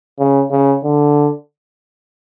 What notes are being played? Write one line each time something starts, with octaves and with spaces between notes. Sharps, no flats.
C#3
C#3
D3